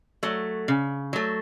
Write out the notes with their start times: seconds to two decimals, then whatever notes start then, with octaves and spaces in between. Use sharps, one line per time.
0.23 F#3 A3
0.68 C#3
1.13 F#3 A3